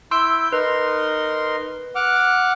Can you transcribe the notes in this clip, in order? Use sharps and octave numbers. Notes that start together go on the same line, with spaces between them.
E4 C6 E6 G6 D7
D#4 A#4 B4 C6
F#5 D6 F6